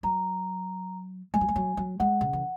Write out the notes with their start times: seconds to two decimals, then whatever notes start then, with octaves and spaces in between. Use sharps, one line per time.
0.03 F#3 A#5
1.34 G#3 G#5
1.41 F#3
1.48 G#3
1.56 F#3
1.77 F#3
2.00 G#3 F#5
2.21 C#3
2.33 E3